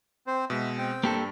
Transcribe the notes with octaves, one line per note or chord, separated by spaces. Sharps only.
C4 C5
B2 G#3 E5
C4 G5
G2 A#3 G4 A4